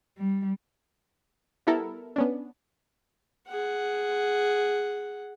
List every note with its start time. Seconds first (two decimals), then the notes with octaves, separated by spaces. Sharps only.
0.18 G3
1.67 G3 B3 E4 A4 A#4
2.16 B3 C#4 D4
3.49 G#4 F#5